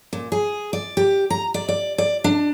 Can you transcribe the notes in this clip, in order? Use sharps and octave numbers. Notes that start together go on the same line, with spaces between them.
A#2
G#4
D5
G4
A#5
D5
D5
D5
D4